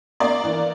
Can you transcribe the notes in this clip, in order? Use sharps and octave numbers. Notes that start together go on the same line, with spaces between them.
A#3 D5
E3